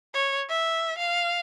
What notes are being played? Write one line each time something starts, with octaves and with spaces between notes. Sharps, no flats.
C#5
E5
F5